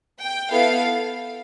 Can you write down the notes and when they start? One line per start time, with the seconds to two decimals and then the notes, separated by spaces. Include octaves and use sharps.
0.20 G5
0.50 B3 E4 A4 F5